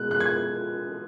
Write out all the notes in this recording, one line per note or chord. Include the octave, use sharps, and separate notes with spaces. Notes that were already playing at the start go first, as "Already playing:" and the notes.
Already playing: B2 G#3 F#6
F#6
G#6